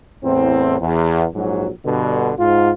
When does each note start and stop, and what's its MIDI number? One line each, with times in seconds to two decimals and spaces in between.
0.24 0.77 40
0.24 0.77 45
0.24 0.77 60
0.81 1.25 40
1.35 1.70 34
1.35 1.70 44
1.35 1.70 54
1.86 2.33 43
1.86 2.33 47
1.86 2.33 50
2.39 2.71 44
2.39 2.71 65